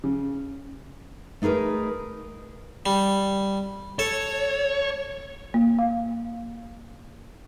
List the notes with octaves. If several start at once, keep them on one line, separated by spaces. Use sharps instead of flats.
C#3
A3 D#4 G#4 A#4 B4
G3
A4 C#5
A#3
F5